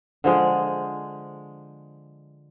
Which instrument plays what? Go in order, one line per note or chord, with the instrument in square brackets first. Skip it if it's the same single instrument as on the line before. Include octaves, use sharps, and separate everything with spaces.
[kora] D3 F3 G#3